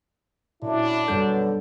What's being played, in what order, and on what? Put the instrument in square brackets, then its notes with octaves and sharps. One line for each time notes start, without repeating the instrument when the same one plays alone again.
[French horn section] F#2 E4 [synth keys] A#2 [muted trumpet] D4
[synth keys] F#2 G3 G6 [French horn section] B2 F#3 [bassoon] D3